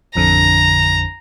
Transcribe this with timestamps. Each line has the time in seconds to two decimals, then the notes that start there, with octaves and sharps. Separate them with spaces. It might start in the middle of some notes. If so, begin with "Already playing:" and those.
0.15 A1 F2 D3 A#5